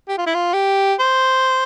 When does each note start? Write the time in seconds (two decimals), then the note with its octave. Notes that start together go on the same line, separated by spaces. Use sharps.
0.09 G4
0.18 F4
0.27 E4
0.35 F4
0.54 G4
1.00 C5